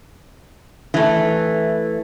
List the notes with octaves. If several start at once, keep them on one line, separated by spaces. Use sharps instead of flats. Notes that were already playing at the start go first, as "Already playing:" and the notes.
E3 A3